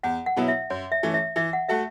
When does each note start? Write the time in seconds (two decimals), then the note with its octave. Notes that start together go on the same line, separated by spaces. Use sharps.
0.03 E2 F#5
0.26 F#5
0.37 B2 F#3 B3 E4
0.48 E5
0.70 F#2 C#5
0.92 E5
1.03 E3 A3 C#4
1.14 E5
1.36 E3 E5
1.53 F#5
1.69 A3 F#4 A4 E5